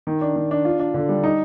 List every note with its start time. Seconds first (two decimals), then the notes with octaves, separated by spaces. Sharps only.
0.07 D#3
0.21 D4
0.36 D#3
0.51 D4
0.65 F4
0.79 D4
0.94 D3
1.09 G3
1.24 D#4